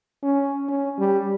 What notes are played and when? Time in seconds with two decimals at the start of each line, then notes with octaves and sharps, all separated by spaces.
0.23 C#4
0.68 C#4
0.99 G3